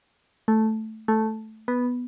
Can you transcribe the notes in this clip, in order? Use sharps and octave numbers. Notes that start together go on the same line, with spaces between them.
A3
A3
B3